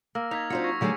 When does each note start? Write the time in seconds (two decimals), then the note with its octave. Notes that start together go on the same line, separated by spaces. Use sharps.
0.15 A#3 E6 F6 A#6
0.31 D#4 G#6 B6 F7
0.50 F#3 C4 D4 F4 C5 C#7
0.64 C#6 G#6 A#6
0.81 D3 F#3 A3 G4 G#4